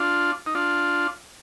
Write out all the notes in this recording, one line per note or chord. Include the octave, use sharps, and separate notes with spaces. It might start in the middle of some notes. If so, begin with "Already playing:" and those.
Already playing: D4 F4
D#4
D4 F4